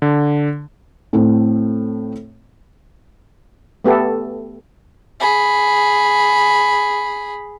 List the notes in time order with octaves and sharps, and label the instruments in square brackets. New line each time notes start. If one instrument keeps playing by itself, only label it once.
[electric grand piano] D3
[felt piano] A2 A3 C4
[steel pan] A3 B3 G4 A4
[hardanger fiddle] G#4 B5